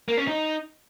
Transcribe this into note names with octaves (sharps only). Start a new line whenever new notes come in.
A#3
C#4
D#4